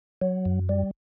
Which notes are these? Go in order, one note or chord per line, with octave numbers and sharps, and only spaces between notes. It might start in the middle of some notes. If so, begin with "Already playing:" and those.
F#3
F#2
G3